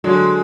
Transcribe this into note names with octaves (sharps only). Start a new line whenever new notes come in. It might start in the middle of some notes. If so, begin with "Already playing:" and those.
D3 F#3 G#3